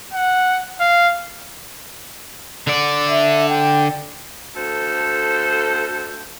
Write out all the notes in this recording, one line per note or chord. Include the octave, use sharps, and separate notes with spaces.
F#5
F5
D3 D5
E5
G5
D2 A4 C5